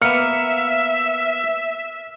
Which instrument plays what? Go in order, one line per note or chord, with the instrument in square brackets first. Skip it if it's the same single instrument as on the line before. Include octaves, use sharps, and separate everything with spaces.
[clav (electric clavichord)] A#3 B3 [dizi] E5 [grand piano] F6 C#7